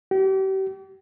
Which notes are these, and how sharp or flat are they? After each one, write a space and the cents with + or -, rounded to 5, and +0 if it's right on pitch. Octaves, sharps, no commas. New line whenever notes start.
G4 -40